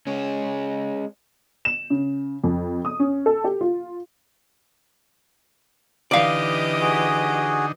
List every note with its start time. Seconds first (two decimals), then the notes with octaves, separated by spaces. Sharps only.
0.07 G#3 C#4
1.65 E7
1.90 C#3
2.44 F2
2.85 D#6
3.00 C#4
3.26 A4
3.44 G4
3.61 F4
6.11 D3 E3 D#4 G4 D5 D#5 F5 F6
6.81 F#4 G#4